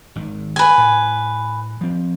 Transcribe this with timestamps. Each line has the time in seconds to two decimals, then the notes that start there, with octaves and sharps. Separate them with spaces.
0.16 G#1 D#3
0.56 B4 G#5
0.78 A2
1.81 F3 C4